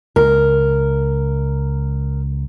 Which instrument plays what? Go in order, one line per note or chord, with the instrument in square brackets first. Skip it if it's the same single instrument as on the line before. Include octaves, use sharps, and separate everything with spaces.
[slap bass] C#2 [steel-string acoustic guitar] A#4